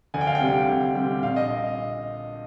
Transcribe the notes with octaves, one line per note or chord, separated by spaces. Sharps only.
D2 G#5
G5
F5
G5
C3 G3
D2
C3 G3
A#1 F5
D#5